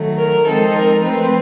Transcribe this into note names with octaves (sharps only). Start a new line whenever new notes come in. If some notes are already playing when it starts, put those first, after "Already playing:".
Already playing: D#3 F#3 A3
A#4
F3 G#3 C4 D#4 A4
A#4
F3 A3 C4 B4